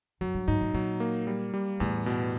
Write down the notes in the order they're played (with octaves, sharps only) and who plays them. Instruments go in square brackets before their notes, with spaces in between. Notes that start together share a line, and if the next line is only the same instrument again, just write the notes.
[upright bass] F#2 [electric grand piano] F#3
[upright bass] G2
[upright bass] G#2 [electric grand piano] D#4
[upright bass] A2
[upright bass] A#2 [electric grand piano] F#3
[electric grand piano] A#3
G3
G3
[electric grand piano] E2 [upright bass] A2
[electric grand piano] B2